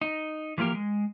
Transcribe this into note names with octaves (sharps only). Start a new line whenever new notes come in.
D#4
E3 F3 A#3 G4 A#4
G#3